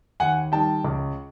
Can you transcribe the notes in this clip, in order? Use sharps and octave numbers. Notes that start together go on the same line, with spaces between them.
D#2 F#5 G#5
D#3 G3 G5 A5
C#2